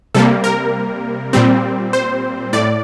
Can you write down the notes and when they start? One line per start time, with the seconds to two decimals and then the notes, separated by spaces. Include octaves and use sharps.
0.15 C3 G3 A#3 A4
0.44 A#4
1.33 A#2 G3 C4
1.93 C5
2.53 A2 D5